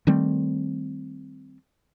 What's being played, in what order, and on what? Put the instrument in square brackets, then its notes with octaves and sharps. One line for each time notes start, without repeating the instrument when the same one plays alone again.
[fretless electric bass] D#3 G3 A3 C4